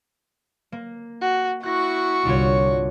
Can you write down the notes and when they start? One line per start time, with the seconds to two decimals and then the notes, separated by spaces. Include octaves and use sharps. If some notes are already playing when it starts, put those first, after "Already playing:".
0.72 A#3
1.21 F#4
1.63 E4 F#4 C#6 F#6 A#6
2.25 G1 C2 D4 F4 C#5